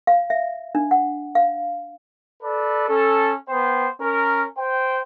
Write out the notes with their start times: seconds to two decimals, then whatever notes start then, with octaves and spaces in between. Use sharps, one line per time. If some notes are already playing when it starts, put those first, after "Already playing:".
0.07 F5
0.30 E5
0.75 D4
0.91 F#5
1.35 F5
2.42 A4 B4 D5
2.88 C#4 A4
3.49 B3 C5 G5
4.01 C#4 A#4
4.57 C5 G5